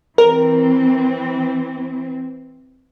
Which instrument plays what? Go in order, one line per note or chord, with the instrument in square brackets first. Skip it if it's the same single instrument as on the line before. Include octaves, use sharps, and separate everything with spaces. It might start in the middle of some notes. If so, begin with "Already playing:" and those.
[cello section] E3 C4 [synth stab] A#4